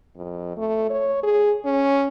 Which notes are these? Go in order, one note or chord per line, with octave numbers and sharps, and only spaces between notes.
F2
A3
C#5
G#4
C#4